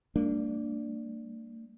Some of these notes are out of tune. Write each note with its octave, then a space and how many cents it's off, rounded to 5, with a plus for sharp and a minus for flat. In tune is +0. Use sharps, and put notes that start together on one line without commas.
G3 +25 A#3 -35 D4 +0